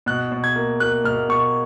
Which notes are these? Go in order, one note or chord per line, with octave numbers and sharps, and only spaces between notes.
B2 F#6
B2
G#6
A#3
A#3 F#6
B2 F6
B2 C#6